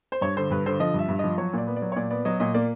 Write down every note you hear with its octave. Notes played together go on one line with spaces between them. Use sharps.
C5
G2 C#5
D3 C5
G2 B4
D3 C5
F3 D#5
G2 E5
G2
F3 D#5
F#3 C#5
A#2 D5
B3
D5
F#3
C#5
A#2 D5
B3 D5
F#3 D#5
A#2 D#5
A#3 D5